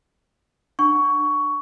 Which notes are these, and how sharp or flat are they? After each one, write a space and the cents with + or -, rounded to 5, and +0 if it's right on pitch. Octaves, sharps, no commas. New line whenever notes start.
D4 +30 F#5 +0 C#6 +15